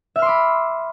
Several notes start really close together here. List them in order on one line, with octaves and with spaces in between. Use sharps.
E5 F6 C6 D6 B5